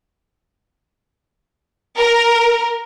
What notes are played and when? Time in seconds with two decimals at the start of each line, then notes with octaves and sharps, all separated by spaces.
1.97 A#4